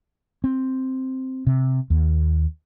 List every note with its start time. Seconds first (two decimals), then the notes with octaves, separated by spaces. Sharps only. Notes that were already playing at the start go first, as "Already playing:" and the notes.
0.44 C4
1.47 C3
1.90 D#2